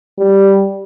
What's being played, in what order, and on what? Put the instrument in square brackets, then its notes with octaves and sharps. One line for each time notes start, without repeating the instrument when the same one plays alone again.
[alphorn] G3